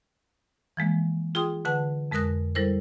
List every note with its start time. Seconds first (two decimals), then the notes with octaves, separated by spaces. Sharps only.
0.77 E3 F3 G#3 A#3
1.35 F4 G#4 G5 C6 D#6
1.65 D3 B4 F#5 A5
2.11 F2 G#3 A#4 D#6 F#6 A#6
2.55 G3 E4 A4 A#4 C5